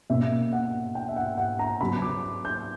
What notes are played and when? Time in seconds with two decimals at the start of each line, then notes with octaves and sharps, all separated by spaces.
0.10 B2 A#3 C#4 E5
0.53 F#5
0.95 G5
1.09 E5
1.16 F#5
1.37 F#5
1.59 A#5
1.81 C#3 F#3 B3 B5
2.02 D6
2.45 G6